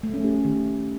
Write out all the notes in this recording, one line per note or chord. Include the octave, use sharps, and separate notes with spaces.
A3
C#4
G4
A3
D#3